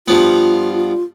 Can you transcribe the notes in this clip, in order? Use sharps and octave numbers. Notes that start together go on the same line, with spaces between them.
G2 F3 B3 F4